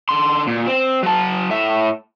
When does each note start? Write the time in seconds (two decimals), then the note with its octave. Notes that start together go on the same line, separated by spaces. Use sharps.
0.09 D3 C6
0.47 A#2
0.67 C4
1.03 F#3 A5
1.50 A2 E5